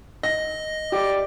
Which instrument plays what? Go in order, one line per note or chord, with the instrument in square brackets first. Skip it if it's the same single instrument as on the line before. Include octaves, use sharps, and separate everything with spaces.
[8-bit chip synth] D#5 [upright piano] A#6
[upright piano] G4 [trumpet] D5